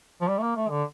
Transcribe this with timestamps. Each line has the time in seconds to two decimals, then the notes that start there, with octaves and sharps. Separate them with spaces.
0.21 F3
0.28 G3
0.38 A3
0.43 A#3
0.56 A3
0.69 D3